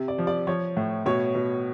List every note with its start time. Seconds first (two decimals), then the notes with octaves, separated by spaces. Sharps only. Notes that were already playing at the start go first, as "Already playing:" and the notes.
Already playing: C3
0.08 D5
0.18 F3
0.27 D5
0.47 F3 C#5
0.77 A2
1.06 B2 C#5
1.35 B2